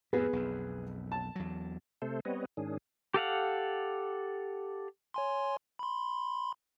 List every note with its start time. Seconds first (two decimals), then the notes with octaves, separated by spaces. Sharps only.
0.13 F2 A2 B3 G#4 B4
0.33 B1 F2
1.12 A5
1.36 E2 F#3
2.02 C3 A3 A4 C5
2.25 G3 B3 C4 B4 C#5 D#5
2.57 G#2 D#3 C#4 D4 G#4
3.14 G4 A4 F5 F#5
5.14 C#5 G#5 C6
5.79 B5 C6